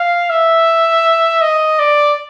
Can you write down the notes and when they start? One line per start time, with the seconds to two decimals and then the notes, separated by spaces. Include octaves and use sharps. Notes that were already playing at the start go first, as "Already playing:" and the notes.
Already playing: F5
0.30 E5
1.42 D#5
1.79 D5